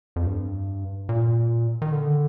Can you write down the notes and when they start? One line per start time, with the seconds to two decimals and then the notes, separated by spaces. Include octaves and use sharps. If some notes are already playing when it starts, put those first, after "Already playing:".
0.16 F2
0.26 G2
1.09 A#2
1.82 D#3
1.92 D3